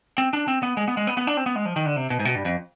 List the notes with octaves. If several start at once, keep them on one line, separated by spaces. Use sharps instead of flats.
C4
D4
C4
B3
G#3
B3
G#3
B3
B3
D4
C4
B3
G#3
F3
D#3
D3
C3
B2
G#2
B2
G2
F2